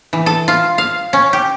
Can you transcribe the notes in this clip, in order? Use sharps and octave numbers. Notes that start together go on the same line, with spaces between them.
E3
A4
F4
F5
C#4
G4